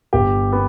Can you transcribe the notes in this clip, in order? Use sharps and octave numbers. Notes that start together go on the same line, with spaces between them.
G1 G4
B3